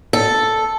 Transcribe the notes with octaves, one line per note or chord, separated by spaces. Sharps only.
A4